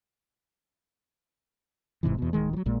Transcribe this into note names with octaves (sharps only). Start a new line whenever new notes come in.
F1 G#2 C3 E3
E2 B2
D1 D#3 G#3
E3 F#3
A#1 A#2 G#3